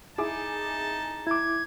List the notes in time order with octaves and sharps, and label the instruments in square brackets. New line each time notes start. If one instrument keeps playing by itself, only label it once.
[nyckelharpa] D#4 A5 [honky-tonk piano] E4 G#4 D6
[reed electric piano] E4 D6 [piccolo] G#6